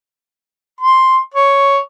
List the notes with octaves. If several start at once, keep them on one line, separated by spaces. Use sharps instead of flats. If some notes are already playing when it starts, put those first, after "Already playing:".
C6
C#5